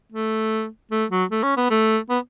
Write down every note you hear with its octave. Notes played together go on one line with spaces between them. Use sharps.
A3
A3
F#3
A3
C#4
B3
A3
B3